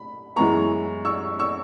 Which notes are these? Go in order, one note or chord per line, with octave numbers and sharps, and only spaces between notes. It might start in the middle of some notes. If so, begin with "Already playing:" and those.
Already playing: B5
F#2 E3 G#3 B3 A#5 C#6
C#6 E6
C#6 E6